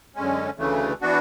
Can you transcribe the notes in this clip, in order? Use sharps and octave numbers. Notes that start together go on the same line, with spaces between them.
F#2 D3 G#3 C#4
D2 C#3 E3 A3
E3 B3 D4 F#4